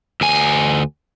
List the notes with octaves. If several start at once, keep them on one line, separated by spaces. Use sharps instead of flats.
D2 G#5